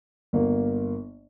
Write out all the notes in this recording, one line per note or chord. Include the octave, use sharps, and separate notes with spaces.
G1 A#3